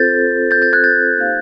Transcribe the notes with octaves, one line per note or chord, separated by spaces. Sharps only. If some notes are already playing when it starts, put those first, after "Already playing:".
Already playing: C4 F4 A4 C5 G6 A6
G6 A6
G6 A6
F#6 G#6
G6 A6
A#3 D#4 G4 C5 F5